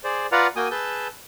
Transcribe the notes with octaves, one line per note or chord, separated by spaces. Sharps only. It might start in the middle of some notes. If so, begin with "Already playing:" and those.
G#4 C5 D5
F4 B4 D5 F5 F#5 A#5
A#3 F#4 G5 G#5 D#6
G#4 B4 A5 E6 G6